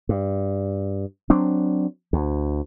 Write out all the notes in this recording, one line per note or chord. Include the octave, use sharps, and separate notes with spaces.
G2
F#3 C4 D4
D2